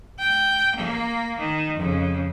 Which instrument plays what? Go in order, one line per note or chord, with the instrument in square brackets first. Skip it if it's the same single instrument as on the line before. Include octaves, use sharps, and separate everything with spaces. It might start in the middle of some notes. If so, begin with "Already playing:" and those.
[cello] G5
A#3
D#3
F2 C#3